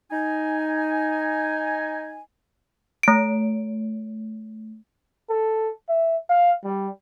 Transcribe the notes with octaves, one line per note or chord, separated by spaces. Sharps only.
D#4 G#5
A3 D7
A4
E5
F5
G3